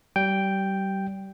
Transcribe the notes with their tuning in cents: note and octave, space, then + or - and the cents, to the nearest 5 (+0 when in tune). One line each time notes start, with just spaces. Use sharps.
G3 -30 G5 +0